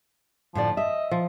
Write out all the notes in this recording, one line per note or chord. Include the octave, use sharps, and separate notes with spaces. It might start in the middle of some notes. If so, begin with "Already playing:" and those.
A2 D3 F3 D5
D#5 E5
F3